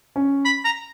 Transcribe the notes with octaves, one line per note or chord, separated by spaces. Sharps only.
C#4
B5
A#5